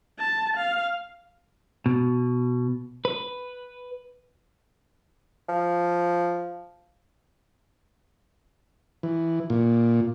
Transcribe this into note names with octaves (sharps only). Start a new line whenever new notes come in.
A5
F5
B2
B4
F3
E3
A#2